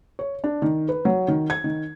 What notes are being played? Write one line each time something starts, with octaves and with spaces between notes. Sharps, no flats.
C#5
D4
D#3
B4
F#3
D#3
G#6
D#3